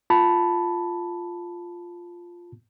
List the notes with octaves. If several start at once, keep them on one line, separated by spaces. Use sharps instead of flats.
F4 A5 B5